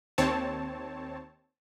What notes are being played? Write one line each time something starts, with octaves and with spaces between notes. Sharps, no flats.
D#2 C4 C#5 A5